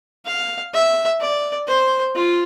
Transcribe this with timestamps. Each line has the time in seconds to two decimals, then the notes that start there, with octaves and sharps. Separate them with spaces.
0.26 F5
0.74 E5
1.21 D5
1.68 C5
2.15 F4